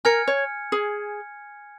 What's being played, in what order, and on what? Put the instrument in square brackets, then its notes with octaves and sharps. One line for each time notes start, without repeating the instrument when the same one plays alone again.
[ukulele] A#4 [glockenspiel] G#5 F6 G#6 C#7
[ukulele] C#5
G#4